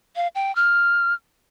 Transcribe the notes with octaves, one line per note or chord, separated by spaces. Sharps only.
F5
G5
F6